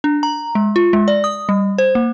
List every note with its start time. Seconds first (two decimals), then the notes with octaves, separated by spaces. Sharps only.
0.04 D4
0.23 A#5
0.55 G#3
0.76 F4
0.93 G#3
1.08 D5
1.24 D#6
1.49 G3
1.78 C5
1.95 A#3